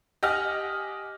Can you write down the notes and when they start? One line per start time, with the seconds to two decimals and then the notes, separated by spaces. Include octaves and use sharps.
0.23 G4 D#5 F#5 G#5 D#6 F6